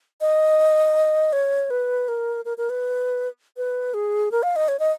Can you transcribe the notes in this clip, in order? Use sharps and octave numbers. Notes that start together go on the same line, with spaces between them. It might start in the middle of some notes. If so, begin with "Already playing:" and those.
D#5
C#5
B4
A#4
A#4
A#4
B4
B4
G#4
A#4
F5
D#5
C#5
D#5